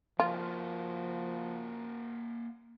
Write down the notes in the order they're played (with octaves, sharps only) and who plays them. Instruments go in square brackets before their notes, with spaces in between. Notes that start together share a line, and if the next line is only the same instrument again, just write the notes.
[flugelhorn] F3 [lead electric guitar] A#3 F#4 [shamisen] F4